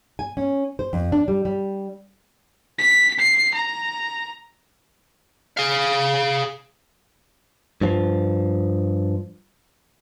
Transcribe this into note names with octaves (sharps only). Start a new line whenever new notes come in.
G#5
C#4
C5
F2
D4
G3
G3
B6
C7
A#5
G#4 F5
G2 F3